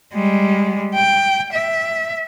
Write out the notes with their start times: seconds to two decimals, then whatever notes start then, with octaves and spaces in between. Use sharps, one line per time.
0.14 G3 G#3
0.95 G5
1.52 E5